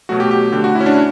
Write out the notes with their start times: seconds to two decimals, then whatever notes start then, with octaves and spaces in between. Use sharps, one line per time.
0.09 B2 F#3 A3 F#4
0.20 G4
0.31 G4
0.52 D3 G4
0.56 A3
0.64 F#4
0.75 E4
0.80 C#4
0.86 D4